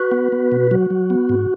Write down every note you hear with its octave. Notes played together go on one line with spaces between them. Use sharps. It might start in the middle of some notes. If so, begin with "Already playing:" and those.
Already playing: F#4 B4
B3
B3
B2
F#3 F#4
F#3
B3
G#2